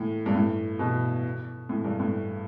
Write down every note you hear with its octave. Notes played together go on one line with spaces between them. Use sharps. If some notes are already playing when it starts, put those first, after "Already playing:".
Already playing: A2
G2
A2
B2
A2
G2
A2